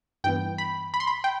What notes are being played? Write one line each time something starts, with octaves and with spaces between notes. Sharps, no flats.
G2 E3 B3 G5
B5
B5
C6
B5
G5